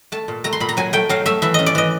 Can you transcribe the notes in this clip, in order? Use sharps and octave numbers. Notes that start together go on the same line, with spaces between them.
A3 A5
A#2
A3 A#5
C6
A#2 B5
A#5
F#3 G#5
A3 G5
F#3 F5
A3 E5
E3 E5
C#4 D#5
D5
E3 D#5